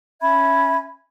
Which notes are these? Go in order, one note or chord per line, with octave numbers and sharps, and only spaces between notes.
C#4 E5 B5 G#6